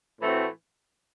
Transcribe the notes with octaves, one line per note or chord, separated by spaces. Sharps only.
A2 E3 A3 C4 F#4